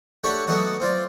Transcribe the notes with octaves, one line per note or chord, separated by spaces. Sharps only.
A3 D4 F#4 G4 C#5
F#3 A3 B3 D4 D#4 F#4
C4 F4 D5